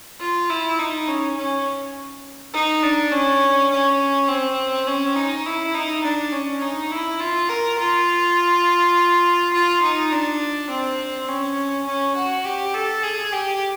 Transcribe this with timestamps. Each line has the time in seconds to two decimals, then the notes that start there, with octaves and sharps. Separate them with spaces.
0.20 F4
0.49 E4
0.78 D#4
1.08 C#4
1.37 C#4
2.53 D#4
2.83 D4
3.12 C#4
3.70 C#4
4.28 C4
4.87 C#4
5.16 D#4
5.46 E4
5.74 D#4
6.03 D4
6.32 C#4
6.61 D#4
6.91 E4
7.20 F4
7.49 A#4
7.79 F4
9.53 F4
9.82 D#4
10.12 D4
10.70 C4
11.28 C#4
11.86 C#4
12.16 F#4
12.44 G4
12.74 A4
13.03 G#4
13.32 G4